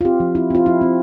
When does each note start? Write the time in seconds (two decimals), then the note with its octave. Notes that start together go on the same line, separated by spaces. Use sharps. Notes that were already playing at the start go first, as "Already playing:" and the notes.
0.01 F4
0.05 C4 G4
0.20 F3
0.35 C4 E4
0.50 C4 F4
0.66 F3 E4
0.81 C4